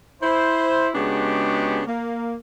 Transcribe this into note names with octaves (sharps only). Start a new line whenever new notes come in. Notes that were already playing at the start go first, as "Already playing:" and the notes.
E4 C5
C#3 G#3 B3 D4 F#4 G4
A#3